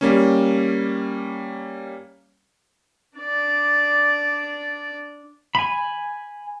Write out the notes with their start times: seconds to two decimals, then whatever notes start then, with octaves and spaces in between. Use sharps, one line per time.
0.01 G3 A#3 C#4
3.18 D4 D5
5.55 G#5 B5